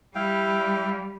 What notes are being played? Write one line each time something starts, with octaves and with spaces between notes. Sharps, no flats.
G3 E4 F5 G5